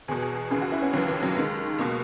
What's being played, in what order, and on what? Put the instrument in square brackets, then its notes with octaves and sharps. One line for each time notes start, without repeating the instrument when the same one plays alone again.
[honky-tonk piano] E2 B2 G#4
G#4
G#4
D#2 C#3 E3 G#4
F#4
E4
C#4
D#2 C#3 E3 F#3
E3
F#3
D#2 D#3 G#3
C#2 B2 A#3